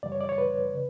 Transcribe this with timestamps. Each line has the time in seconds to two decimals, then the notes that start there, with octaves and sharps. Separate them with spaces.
0.03 F#2 C#3 E3 G3 D5
0.12 C#5
0.21 D5
0.29 C#5
0.38 B4
0.74 C#3